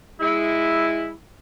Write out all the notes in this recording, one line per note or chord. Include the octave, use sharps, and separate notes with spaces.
G#3 E4